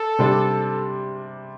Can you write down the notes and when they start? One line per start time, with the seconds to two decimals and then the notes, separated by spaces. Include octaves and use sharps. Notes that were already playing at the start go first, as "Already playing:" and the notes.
Already playing: A4
0.19 C3 G3 D4